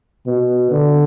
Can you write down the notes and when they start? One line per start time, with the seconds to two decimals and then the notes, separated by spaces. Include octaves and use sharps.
0.27 B2
0.71 D3